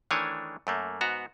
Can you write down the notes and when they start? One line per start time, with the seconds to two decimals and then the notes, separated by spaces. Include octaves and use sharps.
0.11 D#3 E3 A3 D4 C#5 G#5
0.67 F#2 A3 A#3
1.01 G#2 B3 F#4 A#5